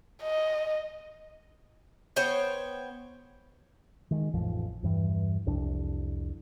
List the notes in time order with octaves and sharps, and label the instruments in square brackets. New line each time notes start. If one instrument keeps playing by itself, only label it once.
[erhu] D#5
[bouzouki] B3 C5 C#5 G5
[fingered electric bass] D#3 G#3
A1 F2 F3
E2 G2 E3
C2 F2 D4